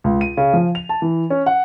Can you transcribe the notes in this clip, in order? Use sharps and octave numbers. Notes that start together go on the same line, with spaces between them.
C#2
D#7
C#3
F3
F7
A5
E3
C#4
F#5